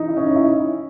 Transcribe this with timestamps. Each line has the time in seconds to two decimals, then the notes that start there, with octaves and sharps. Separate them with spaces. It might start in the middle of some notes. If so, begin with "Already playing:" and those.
Already playing: E3 D#4
0.08 E4
0.17 C#4
0.26 D#4
0.36 E4